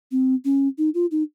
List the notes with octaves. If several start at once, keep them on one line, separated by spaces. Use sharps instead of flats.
C4
C#4
D#4
F4
D#4